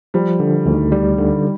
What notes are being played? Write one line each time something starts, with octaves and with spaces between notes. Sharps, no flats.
F3 G3
D3
D2 D#3
G3
D3